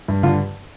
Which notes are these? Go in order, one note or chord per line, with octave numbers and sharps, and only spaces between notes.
G2
D3 F4